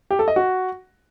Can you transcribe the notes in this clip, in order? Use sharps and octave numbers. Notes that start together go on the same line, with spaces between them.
G4
A4
D#5
F#4